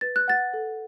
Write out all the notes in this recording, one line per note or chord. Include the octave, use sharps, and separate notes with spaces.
B4 A6
F#6
F#5 A6
A4